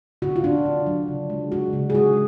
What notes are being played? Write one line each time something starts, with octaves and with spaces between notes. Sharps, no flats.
D3 F#4
F4
D3 D4
D3
F#3
C#3
G#3
G#3 F#4
C#3
G#4
G#3 F#4